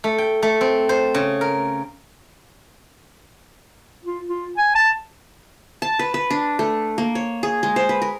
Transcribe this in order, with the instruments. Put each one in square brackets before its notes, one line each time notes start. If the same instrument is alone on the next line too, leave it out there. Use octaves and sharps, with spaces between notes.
[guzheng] A3
G5
A3
C4
C5
C#3
A#4
[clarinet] F4
F4
G#5
A5
[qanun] A5
B4
B4
D4
A3
A#3
C#5
G#4
G#3
C5
B4
A#4